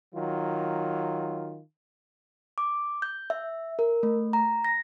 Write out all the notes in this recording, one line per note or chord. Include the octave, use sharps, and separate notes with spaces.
D#3 F#3 F4
D6
G6
E5
A#4
A3
A#5
A#6